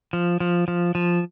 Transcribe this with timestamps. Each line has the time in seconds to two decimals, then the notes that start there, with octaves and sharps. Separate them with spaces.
0.13 F3
0.40 F3
0.68 F3
0.95 F3